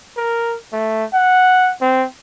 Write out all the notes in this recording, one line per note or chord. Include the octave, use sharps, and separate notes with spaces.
A#4
A3
F#5
C4